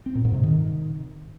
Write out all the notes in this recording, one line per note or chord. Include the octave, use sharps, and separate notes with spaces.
C4
A#2
G#2
C3
D#3